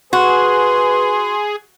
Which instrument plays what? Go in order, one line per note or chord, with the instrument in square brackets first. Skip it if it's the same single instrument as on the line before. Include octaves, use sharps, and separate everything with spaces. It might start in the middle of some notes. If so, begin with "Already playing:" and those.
[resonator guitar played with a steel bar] F#4 [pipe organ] G#4 [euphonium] B4 [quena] C6